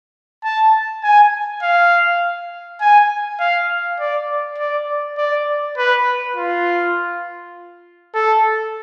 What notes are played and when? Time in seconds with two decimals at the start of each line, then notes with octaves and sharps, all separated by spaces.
0.44 A5
1.04 G#5
1.62 F5
2.81 G#5
3.40 F5
4.00 D5
4.58 D5
5.18 D5
5.77 B4
6.36 F4
8.15 A4